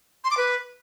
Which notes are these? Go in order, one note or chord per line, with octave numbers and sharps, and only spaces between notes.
C6
D6
B4